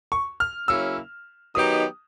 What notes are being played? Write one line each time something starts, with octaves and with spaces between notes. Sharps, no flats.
C#6
F6
C#3 F#3 A#3 C#4 E4 E6
D#3 F#3 B3 D#4 G4 D#6